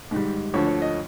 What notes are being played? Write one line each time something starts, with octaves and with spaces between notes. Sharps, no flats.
G#2 D#3 G3
D2 D3 F3 C#5
C#5
D#5